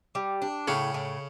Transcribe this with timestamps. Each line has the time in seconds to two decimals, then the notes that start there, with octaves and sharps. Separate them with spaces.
0.15 G3
0.42 D4
0.68 A2 C#3 C#4
0.94 A2